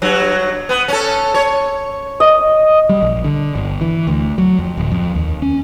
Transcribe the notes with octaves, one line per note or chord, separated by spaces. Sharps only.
G2 F#3
B3
C#4 A4
C#5
D#5
G3
A#1
D3
G1
E3
D2
F#3
F2
D1
F2
D#2
C#4